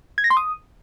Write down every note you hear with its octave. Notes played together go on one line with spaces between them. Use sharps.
G#6
A#6
C6
D#6